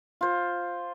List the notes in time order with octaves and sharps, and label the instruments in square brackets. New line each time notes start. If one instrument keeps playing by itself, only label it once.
[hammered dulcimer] F4 C5